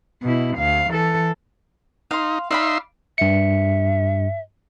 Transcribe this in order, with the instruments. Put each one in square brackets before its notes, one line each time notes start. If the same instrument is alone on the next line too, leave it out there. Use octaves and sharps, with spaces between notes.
[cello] B2 E4
D2 F5
E3 A4
[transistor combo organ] D#4 [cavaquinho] F5 C6
[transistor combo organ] D#4 E5 C6 [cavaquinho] D5 F5 B5
[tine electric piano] G2 C#7 [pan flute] E5